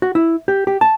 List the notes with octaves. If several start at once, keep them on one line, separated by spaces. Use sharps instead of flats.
F#4
E4
G4
G4
A5